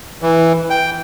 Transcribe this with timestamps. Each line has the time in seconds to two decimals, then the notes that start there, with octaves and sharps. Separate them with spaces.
0.22 E3
0.70 G5